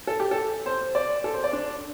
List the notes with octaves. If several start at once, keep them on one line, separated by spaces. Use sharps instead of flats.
A4
G4
A4
C5
D5
A4
C5
D5
D4